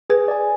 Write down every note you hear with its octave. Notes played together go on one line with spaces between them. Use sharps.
G#4 B4
D5 G#5